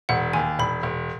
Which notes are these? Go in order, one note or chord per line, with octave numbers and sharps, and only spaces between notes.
E1 F#5
D#2 G#5
E1 B5
E1